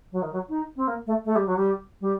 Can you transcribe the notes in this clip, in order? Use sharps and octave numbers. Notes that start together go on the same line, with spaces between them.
F#3
D#3
F#3
D#4
C4
A#3
A3
A3
G3
F#3
G3
G3